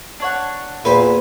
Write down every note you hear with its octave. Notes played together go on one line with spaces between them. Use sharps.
D4 C#5 F#5
E2 A#2 B4 C5